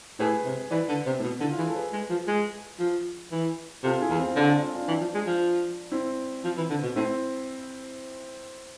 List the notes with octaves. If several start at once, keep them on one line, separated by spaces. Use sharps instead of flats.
A2 G#4 B4
C3
E3 B4 D5
D3
C3
A2
B2
D3 E4
F4
E3 G#4
A4
G#4 B4
G#3
F3
G#3
F3
E3
C3 F4 A4
E4 G#4
E2
C4
D3 D4
D4
D4 F4
D4 F4
E3 D4
F3
G#3
F3
C4 E4
F3
E3
D3
B2
A2 C4 E4